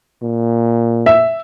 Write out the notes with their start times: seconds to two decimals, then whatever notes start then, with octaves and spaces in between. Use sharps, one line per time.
0.23 A#2
1.06 E5